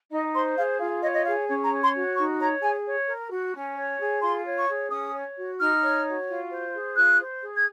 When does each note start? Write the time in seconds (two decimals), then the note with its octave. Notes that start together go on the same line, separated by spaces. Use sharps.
0.11 D#4 D#5
0.33 C5 C6
0.56 G#4 F5
0.79 F4 F5
1.02 C#5 D#5
1.14 D#5
1.25 G#4 F5
1.47 C#4 C#5
1.65 A#5
1.71 C#5
1.82 C6
1.94 F#4
2.16 D#4 C#6
2.40 C#5 A#5
2.62 G#4 G#5
2.85 C#5
3.08 A#4
3.31 F#4
3.54 C#4
3.77 C#5
4.00 G#4
4.22 F4 C6
4.45 C#5
4.57 C#6
4.68 G#4
4.90 C#4 D#6
5.13 C#5
5.37 F#4
5.60 D#4 F6
5.82 C#5
6.05 F#4
6.28 F4
6.51 C5
6.74 G#4
6.96 F4 F#6
7.19 C5
7.42 G#4
7.56 G#6